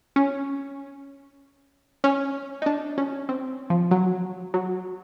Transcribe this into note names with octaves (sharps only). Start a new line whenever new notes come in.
C#4
C#4
D#4
D4
C#4
C4
F3
F#3
F#3